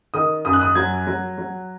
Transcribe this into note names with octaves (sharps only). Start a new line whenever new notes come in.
D#3 D#6
F#2 D#6
F#6
D#6
F#3 G#6
F#3
F#3